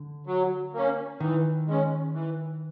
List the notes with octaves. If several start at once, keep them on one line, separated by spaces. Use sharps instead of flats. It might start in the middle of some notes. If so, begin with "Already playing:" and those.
Already playing: D3
F#3
A#3 C#4
D#3 E3
G#3 C#4
E3